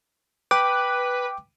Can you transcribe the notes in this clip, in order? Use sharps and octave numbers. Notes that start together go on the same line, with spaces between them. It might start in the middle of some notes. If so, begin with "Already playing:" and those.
B4 G5 D6